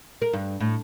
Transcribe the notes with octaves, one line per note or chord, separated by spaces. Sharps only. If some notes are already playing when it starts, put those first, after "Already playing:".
A#4
G2
A2